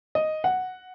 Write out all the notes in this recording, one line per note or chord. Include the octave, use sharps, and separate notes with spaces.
D#5
F#5